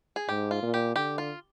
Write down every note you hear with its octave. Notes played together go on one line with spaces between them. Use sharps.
G#4
G#2 G4
F4
A#2
G4
D3 G4
F4